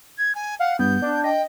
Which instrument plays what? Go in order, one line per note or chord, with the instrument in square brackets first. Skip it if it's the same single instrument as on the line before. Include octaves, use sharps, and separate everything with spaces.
[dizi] G#6
G#5
[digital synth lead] F5 [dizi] F#5
[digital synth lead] G2 [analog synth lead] B3 [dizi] G6
[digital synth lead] D4
[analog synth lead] D#5 [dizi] G5